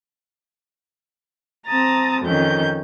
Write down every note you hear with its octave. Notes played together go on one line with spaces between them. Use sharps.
C4 A5 A#5 D#6 A6
F2 D#3 C#4 G6